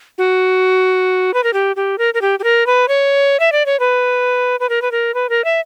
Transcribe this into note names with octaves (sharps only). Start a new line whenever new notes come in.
F#4
B4
A#4
G4
G4
A#4
A#4
G4
G4
A#4
B4
C#5
E5
D5
C#5
B4
B4
A#4
B4
A#4
B4
A#4
E5